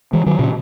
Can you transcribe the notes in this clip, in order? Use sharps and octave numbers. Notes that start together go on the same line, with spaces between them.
E3 G#3
D#3 F#3
A#2 C#3